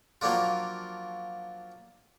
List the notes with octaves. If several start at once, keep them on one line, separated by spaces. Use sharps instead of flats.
F3 F#3 A#3 D4 F4